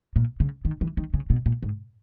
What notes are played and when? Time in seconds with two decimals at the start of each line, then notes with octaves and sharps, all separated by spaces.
0.16 A#2
0.40 C#3
0.65 D#3
0.81 E3
0.97 D#3
1.14 C#3
1.30 B2
1.46 A#2
1.63 G#2